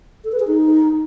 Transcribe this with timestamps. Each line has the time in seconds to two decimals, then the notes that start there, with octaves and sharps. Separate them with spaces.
0.24 A4
0.32 B4
0.40 G#4
0.47 D#4